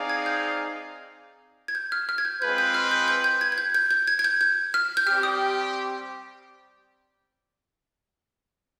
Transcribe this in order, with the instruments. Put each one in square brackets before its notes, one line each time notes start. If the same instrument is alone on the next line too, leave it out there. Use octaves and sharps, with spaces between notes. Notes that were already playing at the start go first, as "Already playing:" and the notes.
Already playing: [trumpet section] C4 D#4 G#4 D5 F5
[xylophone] G#6
G6
G#6
G6
F6
F6
G#6
G6
[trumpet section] G#3 C4 F4 B4 [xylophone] G6
[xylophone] G6
F6
G6
G6
G6
G#6
G#6
G6
G6
G6
G#6
G#6
G6
G6
F6
G6
[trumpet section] G3 C4 G4 [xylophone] F6
[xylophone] D#6